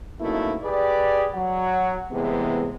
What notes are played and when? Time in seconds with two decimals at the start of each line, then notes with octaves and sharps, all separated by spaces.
0.20 F#2 B2 A3 A#3 D#4 E4
0.63 G4 G#4 B4 D5
1.35 F#3 F#5
2.11 E2 A2 C3 E3 G#3 B3